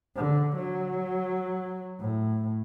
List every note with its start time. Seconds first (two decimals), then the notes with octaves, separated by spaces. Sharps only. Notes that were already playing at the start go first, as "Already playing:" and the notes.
0.16 D3
0.56 F#3
2.00 A2